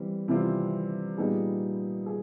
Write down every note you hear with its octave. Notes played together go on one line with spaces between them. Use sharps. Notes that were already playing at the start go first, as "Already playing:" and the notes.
Already playing: E3 G3 C4
C3 E3 G3 C4 F4
A#2 G3 B3 D#4 G#4
G#4